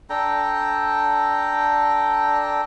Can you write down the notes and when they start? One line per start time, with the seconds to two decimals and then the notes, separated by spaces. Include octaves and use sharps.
0.10 D4 A4 G5 A#5